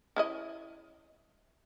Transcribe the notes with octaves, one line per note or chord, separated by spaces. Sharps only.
C#4 E4 D#5